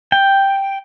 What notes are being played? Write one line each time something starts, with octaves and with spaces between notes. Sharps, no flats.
G5